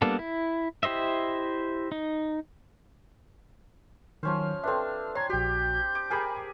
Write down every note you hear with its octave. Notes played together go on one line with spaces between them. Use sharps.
G3 A#3 B3 D4 A4
E4
E4 G4 C5 D#5 E5
D#4
D#3 F3 F#3 C#4 C5 F6
C4 D4 A4 B4 E5
C#5 A#5 C6 G#6
A#1 F#4 G4 G6
D6
G4 G#4 A#4 G#5 B5